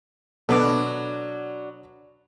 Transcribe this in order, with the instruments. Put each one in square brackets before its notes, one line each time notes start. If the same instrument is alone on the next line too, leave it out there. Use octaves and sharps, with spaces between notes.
[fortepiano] B2 B3 B4 [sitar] F#3 D4 [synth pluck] A4 D6